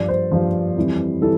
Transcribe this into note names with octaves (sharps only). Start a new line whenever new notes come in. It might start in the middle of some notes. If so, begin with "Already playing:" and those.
Already playing: G2 F3 D5
C5
G2 F3
F2 E3 G3
E3 G3 A4